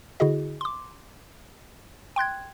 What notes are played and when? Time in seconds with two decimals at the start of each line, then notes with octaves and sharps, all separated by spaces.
0.20 D3 E4 F#4 G#4 D#5
0.61 C6 D6
2.16 G5 C6 F#6 G#6